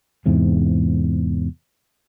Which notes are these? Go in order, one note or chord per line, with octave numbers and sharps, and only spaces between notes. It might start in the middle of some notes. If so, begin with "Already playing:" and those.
E2 G#2 C3